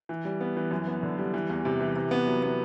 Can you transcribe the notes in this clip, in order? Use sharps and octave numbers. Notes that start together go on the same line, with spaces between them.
E3
G3
B3
E3
F#2
B3
D3
G3
E3
E2
C3
E3
C3
B3
F#3
B3